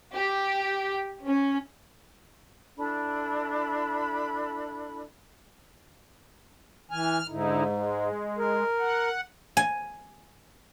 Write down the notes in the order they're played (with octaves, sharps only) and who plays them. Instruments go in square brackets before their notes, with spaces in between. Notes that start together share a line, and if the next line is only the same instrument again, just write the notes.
[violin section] G4
C#4
[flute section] D4 E4 A4 B5
[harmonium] E3 G#5 [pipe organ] F6
[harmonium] G#2 [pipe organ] D3 D#4 E4
[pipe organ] G#3
[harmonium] A#4
[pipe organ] F#5
[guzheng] G#5